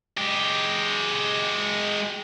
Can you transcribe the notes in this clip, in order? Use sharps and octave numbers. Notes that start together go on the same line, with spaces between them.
G#3 G4